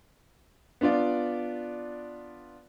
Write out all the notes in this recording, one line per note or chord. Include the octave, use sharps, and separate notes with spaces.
B3 D4 F4 D5